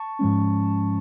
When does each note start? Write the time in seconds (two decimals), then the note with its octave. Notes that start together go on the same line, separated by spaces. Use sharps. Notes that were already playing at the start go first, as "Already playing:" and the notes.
Already playing: A5 C#6
0.19 G#2 F3 G#3 C#4